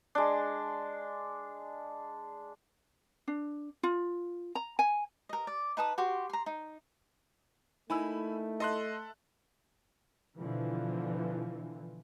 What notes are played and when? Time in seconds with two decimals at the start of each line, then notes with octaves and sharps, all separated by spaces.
0.15 G#3 D4
3.28 D4
3.83 F4
4.55 A#5
4.79 G#5
5.29 A#4 D#5
5.47 D5
5.77 D#4 B4 A5 D#6
5.98 F#4 G4 C6
6.30 A#5 C6
6.46 D#4
7.90 A3 A#3 D#4 E4 G#5 B5 E6
8.60 A4 D#5 E5 C6 F#6
10.37 B2 D3 E3 F3